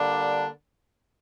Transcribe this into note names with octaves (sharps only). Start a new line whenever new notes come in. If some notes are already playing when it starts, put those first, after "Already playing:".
Already playing: D3 G3 A#3 D4